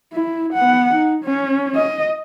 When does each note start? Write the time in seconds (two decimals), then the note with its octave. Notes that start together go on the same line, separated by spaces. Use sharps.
0.13 E4
0.53 B3 F#5
0.94 D#4
1.24 C#4
1.75 D#5